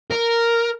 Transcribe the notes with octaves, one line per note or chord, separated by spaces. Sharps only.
A#4